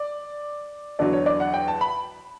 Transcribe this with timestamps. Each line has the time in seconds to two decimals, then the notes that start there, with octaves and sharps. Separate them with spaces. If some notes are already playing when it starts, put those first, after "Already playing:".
Already playing: D5
0.99 E2 D3 F#3 D5
1.13 C#5
1.26 D5
1.40 F#5
1.54 G5
1.68 A5
1.81 B5